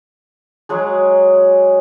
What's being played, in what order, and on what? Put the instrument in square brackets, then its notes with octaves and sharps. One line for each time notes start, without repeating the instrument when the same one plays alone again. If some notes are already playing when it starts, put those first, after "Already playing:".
[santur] F#3 G#3 G#4